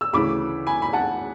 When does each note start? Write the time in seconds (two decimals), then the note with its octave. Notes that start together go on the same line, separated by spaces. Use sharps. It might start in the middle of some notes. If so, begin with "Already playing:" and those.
0.01 E6
0.13 D2 C#3 E3 B5 D6
0.67 G#5 B5
0.82 B5
0.93 F#5 A5